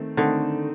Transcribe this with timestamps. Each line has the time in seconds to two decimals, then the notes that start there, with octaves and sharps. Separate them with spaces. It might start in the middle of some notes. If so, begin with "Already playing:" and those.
Already playing: D#3 A3 C4 D#4
0.17 D3 D#3 A3 C4 D#4